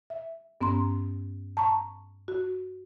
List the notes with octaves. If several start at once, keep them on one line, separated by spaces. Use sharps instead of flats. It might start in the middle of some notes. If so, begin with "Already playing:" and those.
E5
G2 B3 C#4 A#5 C6
A5 A#5 C#6
F#4